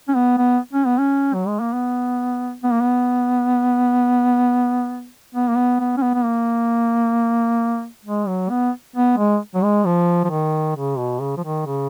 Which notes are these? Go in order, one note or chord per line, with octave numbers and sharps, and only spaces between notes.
C#4
B3
B3
C#4
B3
C#4
F#3
G#3
A#3
B3
B3
A#3
B3
B3
A#3
B3
B3
C#4
B3
B3
A#3
G#3
F#3
B3
B3
G#3
F#3
G#3
F3
F3
D#3
C#3
B2
C#3
F3
D#3
C#3